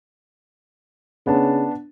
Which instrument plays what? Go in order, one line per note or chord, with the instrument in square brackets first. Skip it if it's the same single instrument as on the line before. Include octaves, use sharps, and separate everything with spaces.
[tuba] C#3 [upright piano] B3 D4 A5